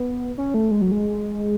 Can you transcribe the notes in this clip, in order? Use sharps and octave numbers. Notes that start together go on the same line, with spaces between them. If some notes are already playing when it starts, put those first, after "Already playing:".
Already playing: B3
C#4
A3
G#3
F#3
G#3